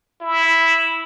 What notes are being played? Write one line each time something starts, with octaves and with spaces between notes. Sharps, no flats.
E4